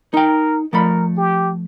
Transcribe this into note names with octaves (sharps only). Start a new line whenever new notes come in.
D#4 A#4 G5
F3 A3 A#4 B5
G4